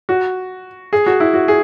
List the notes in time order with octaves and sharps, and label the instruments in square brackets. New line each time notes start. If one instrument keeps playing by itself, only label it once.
[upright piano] F#4
G#4
F#4
E4
F#4
G#4